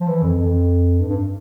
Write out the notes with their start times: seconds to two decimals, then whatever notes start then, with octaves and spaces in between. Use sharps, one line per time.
0.01 F3
0.07 E3
0.22 F2
0.38 F2
0.99 G2
1.09 G2